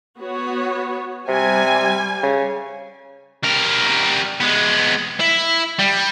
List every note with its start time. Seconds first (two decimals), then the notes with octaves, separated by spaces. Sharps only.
0.20 B3 F#4 C#5
1.28 C3 G3 G#5
2.23 C#3
3.43 G3 A#4
4.40 G#3 B3
5.20 E4 E5
5.79 G3